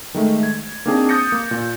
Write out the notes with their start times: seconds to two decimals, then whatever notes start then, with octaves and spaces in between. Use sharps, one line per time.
0.14 D#3 G#3 A3
0.43 G#6
0.86 A#3 C4 D4 D#4 G#4 A5
1.09 D#6 G6 A6 A#6 C#7
1.32 A#3 G6
1.51 A#2